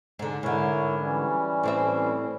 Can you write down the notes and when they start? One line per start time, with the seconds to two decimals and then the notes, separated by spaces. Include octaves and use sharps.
0.19 G#2 D3
0.43 G#2 D3 E4 A#4 C#5
0.99 E3 G3 C#4
1.63 A2 C4 E5